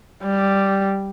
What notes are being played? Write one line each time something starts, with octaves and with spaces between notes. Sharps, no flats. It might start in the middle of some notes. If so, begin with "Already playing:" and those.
G3